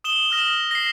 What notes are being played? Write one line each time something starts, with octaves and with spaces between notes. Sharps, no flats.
D#6 E7 G7
D#6 F6 A#6 E7
A#6 C7